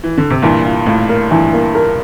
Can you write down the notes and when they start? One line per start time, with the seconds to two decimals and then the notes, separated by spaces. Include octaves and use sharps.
0.04 E3
0.17 D3
0.30 C3
0.42 G2 A#2 E3
0.65 F4
0.86 A2 F4
1.09 A#4
1.31 G2 E3
1.53 A#3
1.75 A#4